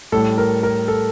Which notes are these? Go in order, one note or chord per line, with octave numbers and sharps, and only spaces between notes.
A2 G3 A4
A#4
A#4
A4